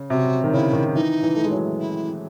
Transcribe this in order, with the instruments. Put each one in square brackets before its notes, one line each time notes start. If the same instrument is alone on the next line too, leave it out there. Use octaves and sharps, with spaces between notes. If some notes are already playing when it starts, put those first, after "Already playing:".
Already playing: [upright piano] C#3
[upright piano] C3 [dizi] F#4
[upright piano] D#3
[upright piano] C#3 [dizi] E4
[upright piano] D#3
[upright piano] E3 [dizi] D#4
[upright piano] E3
A3
G#3
F#3
[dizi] E4